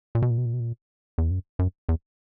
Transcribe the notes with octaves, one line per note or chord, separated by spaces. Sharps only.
A#2
B2
A#2
B2
A#2
B2
A#2
E2
F#2
F#2
E2